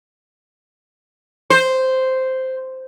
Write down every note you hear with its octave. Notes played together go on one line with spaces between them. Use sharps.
C5